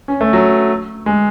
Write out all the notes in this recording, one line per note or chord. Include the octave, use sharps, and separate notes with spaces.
C#4
A3
F#3
G#3